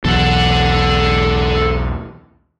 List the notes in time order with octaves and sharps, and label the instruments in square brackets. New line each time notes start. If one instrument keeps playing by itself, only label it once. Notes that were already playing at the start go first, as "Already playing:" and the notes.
[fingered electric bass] B1 E2 [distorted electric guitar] A4 F#5